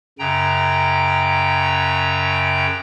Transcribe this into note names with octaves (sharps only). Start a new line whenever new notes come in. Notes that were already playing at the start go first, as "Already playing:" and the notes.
F#2 C#3 G5 A#5